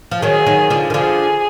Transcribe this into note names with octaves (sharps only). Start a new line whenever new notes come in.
F3
D#3 F#3 G#4
D#3 F#3
D3 F3
D#3
D3 F3 G#4